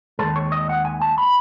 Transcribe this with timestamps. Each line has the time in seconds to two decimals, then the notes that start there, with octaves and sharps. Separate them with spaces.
0.19 D#2 D#3 G#3 A4
0.36 C#5
0.52 D#5
0.69 F#5
0.85 G#5
1.02 A5
1.18 B5